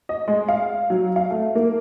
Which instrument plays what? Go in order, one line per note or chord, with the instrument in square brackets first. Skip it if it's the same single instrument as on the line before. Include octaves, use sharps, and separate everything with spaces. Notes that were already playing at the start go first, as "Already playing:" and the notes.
[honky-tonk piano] D#5
G#3
F5
F#3
F5
A3
A#3